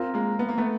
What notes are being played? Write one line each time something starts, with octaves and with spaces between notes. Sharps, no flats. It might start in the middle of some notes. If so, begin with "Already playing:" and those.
Already playing: C4 F4 A#4
G#3 A#3
B3
A#3
A3 B3